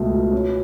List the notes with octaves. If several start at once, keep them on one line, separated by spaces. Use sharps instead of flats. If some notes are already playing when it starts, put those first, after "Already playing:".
Already playing: C#2 B2 A3
B2
C#4